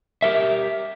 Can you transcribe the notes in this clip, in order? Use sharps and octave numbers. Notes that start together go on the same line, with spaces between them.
G4 A#4 E5